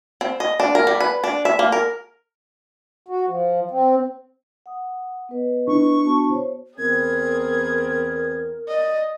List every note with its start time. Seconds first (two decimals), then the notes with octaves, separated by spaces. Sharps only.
0.21 C4
0.40 D#5
0.60 D4
0.75 A#4
0.87 G3
1.00 B4
1.24 D4
1.45 E5
1.59 A#3
1.72 A#4
3.08 F#4
3.28 F3
3.71 C4
4.66 F#5 D#6
5.29 B3 B4 D#5
5.68 D4 E4 C#6
6.02 B3 F#4 A5
6.30 C5 C#5
6.78 E2 B3 C4 G#4 A#4 G#6
8.68 D5 D#5